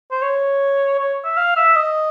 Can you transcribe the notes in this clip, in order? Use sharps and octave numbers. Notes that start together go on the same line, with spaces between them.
C5
C#5
C#5
E5
F5
E5
D#5